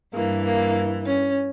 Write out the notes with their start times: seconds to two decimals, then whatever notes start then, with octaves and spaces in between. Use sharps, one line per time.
0.14 G2 E3 A#3
0.45 A#3
1.06 C#4